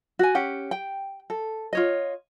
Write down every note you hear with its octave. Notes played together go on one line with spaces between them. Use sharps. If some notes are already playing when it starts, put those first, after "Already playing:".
F#4 G#5
C#4 G4 F#5
G5
A4
F4 C#5 D#5